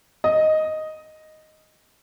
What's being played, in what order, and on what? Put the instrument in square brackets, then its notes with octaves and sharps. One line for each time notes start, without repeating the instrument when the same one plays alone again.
[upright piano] D#5